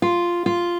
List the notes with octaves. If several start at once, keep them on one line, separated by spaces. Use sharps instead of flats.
F4
F4